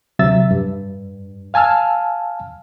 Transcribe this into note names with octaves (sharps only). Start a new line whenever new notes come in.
D2 C3 F#3 E5 E6 A6
G2
F5 G#5 A5 E6 F6